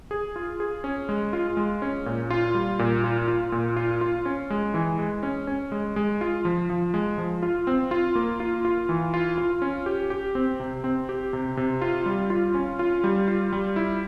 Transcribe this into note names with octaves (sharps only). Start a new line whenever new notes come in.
G#4
F4
G#4
C#4
G#3
F4
G#3
C#4
A#2
F4
G3
A#2
F4
F4
A#2
F4
F4
C#4
G#3
E3
G#3
C#4
C#4
G#3
G#3
F4
F3
F3
G#3
F3
F4
C4
F4
A#3
F4
F4
E3
F4
F4
C#4
G4
G4
C4
C3
C4
G4
C3
C3
F4
G3
F4
C#4
F4
G3
F4
G3
E4